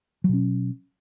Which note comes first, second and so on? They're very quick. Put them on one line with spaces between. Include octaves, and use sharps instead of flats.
F#3 B2 C#4